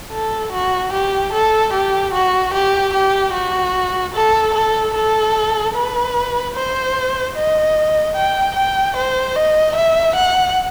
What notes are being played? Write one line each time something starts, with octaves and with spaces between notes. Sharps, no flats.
A4
F#4
G4
A4
G4
F#4
G4
G4
F#4
A4
A4
A4
B4
C5
D#5
G5
G5
C5
D#5
E5
F#5